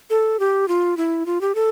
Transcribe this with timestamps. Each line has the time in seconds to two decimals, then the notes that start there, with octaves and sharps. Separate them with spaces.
0.10 A4
0.40 G4
0.68 F4
0.97 E4
1.26 F4
1.41 G4
1.55 A4